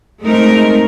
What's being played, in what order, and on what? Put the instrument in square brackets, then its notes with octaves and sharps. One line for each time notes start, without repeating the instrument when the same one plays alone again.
[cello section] G#3 A3 C4 D#4 A#4